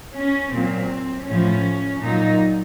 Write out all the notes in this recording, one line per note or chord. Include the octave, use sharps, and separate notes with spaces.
C#4
A#2 F#3 C4
A2 F3 C#4
A#2 F#3 D#4